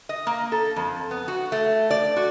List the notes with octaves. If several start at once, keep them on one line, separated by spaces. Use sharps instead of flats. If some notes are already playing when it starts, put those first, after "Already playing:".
D#5
A#3
A4
F2
B3
F#4
A3
D5
F#4